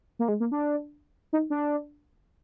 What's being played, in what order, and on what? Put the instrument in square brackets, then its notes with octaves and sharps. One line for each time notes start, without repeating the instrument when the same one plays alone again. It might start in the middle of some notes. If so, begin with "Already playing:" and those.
[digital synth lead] A#3
G#3
A#3
D4
D#4
D4